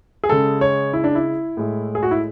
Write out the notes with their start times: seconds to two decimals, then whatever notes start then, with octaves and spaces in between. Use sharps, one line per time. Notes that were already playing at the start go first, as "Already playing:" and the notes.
0.24 G#4
0.29 C#3 G#3 A4
0.61 C#5
0.93 E4
1.04 D4
1.15 E4
1.57 A2 G#3
1.95 G#4
2.03 F#4
2.11 E4